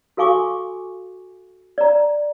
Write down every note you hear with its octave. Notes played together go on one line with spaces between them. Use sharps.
F#4 A4 F5 G#5 C#6 D6
D5 A#5